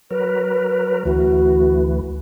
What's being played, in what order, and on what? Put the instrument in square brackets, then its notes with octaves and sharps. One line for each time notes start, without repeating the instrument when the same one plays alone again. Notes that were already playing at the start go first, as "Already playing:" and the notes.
[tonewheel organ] F#3 A#4 [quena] B4
[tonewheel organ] D2 E3 [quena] F#4